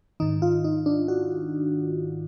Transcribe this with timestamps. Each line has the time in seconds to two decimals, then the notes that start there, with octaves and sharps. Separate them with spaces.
0.20 G#2 D#3 D#4
0.42 F4
0.64 D#4
0.86 D4
1.08 F#4